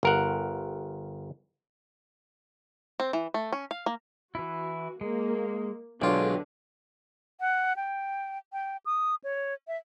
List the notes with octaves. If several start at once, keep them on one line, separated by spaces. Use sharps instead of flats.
G1 A#4 F#5
C4
E3
A3
C#4
F5
A#3
E3 E4 F#4
G#3 A#3
B1 D3 F#3 G#3 F4 G5
F#5
G5
G5
D#6
C#5
E5